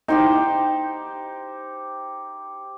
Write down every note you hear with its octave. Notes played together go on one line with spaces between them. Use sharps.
D#4 G4 C5 G5